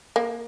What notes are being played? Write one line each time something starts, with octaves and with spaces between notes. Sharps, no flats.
A#3